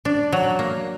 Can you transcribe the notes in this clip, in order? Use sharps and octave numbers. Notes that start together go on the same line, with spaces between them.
D4
F#3
A#3